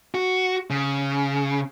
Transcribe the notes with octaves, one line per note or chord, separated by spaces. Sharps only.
F#4
C#3